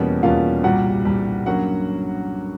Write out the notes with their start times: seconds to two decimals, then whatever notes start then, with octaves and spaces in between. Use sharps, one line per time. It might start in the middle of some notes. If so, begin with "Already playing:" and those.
Already playing: E2 B2 G3 A#3 C#4
0.23 E2 B2 G3 A#3 C#4 F4 F5
0.64 C2 A#2 G3 F#4 F#5
1.05 C2 A#2 G3
1.46 G2 D3 F#3 A#3 C#4 F#4 F#5